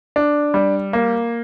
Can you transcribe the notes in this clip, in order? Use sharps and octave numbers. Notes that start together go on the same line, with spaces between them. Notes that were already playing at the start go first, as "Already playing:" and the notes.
D4
G3
A#3